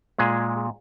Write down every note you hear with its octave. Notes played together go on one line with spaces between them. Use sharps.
A#2 G#3 G#4